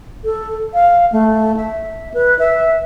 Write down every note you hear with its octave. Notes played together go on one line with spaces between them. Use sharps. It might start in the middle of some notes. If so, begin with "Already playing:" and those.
A4
F5
A3
E5
B4
E5